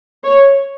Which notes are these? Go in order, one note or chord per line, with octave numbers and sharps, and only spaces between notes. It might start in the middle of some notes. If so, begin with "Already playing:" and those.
C#5